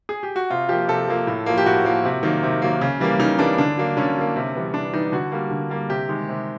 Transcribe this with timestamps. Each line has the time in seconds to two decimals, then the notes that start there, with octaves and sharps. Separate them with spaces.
0.09 G#4
0.23 G4
0.36 F#4
0.50 C3 F4
0.69 F3 A#3 G4
0.88 C3 A4
1.08 F3 A#3
1.27 A2
1.46 F3 A#3
1.58 G4
1.65 A2 F#4
1.85 F3 A#3
2.05 C3
2.23 D#3 F#3 A#3
2.43 C3
2.62 D#3 F#3 A#3
2.81 C#3
3.00 E3 G3 A#3
3.19 C#3 D#4
3.39 E3 G3 A#3 D4
3.58 D3 D4
3.77 F#3 A#3
3.97 D3 C#4
4.16 F#3 A#3
4.36 C3
4.55 E3 G3 B3
4.74 C3 D4
4.93 E3 G3 B3 D#4
5.12 D3 F#4
5.32 G3 A#3
5.51 D3
5.70 G3 A#3
5.89 C3 G4
6.09 D#3 G#3
6.29 C3